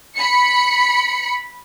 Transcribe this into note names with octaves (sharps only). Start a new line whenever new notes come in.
B5 C#7